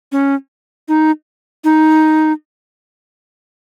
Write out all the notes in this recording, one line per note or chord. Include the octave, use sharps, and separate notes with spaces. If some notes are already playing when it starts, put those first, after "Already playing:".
C#4
D#4
D#4